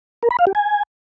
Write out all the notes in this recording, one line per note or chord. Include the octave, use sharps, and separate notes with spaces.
A#4
B5
F5
G4
G#5